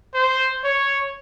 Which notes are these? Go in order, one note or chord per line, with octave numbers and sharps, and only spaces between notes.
C5
C#5